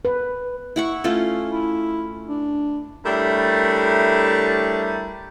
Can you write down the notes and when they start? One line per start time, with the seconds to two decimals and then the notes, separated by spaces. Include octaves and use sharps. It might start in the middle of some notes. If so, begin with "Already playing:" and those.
0.05 B4
0.76 E4 F#5 C#6
1.04 A3 C#4 F4
1.50 E4
2.28 D4
3.05 G3 A3 D4 E4 A#4 C#5